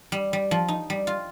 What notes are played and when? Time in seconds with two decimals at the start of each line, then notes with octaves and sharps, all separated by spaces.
0.12 G3
0.33 G3
0.51 F3
0.68 D#4
0.90 G3
1.07 F4